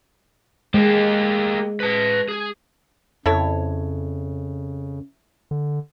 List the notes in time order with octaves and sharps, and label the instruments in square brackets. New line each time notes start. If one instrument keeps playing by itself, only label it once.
[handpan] G#3 [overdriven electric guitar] A#3 G4
[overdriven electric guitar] B4 A5
G#4
[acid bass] F2 [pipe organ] C#3 [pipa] E4 A4 C#5
[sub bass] D3